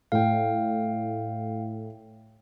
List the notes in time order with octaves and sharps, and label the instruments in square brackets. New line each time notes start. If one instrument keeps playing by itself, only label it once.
[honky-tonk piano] A2 [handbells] F5 G5